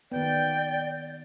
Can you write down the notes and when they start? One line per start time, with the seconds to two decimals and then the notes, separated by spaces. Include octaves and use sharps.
0.12 D#3 B3 D5 G5